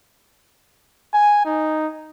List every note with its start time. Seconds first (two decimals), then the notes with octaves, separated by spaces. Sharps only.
1.14 G#5
1.45 D#4